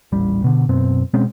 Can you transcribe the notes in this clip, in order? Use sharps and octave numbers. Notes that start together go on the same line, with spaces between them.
D#1 A1 G3
B2 D3
F#2 B2 C4
B2 G#3 C4 C#4